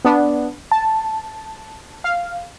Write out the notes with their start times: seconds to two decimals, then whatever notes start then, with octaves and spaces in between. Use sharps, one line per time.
0.05 B3 D4
0.72 A5
2.04 F5